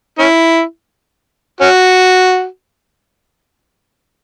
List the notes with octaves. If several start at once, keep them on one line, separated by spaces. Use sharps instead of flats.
C#4 E4
C#4 F#4